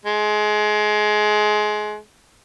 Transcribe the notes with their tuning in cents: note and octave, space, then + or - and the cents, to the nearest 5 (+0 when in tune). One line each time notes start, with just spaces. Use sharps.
G#3 +25